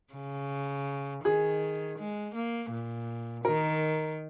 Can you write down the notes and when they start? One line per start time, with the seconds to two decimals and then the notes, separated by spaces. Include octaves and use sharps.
0.14 C#3
1.25 D#3 G#4
1.99 G#3
2.35 A#3
2.71 A#2
3.45 D#3 A#4